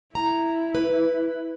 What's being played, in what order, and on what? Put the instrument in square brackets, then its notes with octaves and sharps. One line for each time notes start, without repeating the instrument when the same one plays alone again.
[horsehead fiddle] E4 [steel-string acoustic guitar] A#5
[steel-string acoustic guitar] B4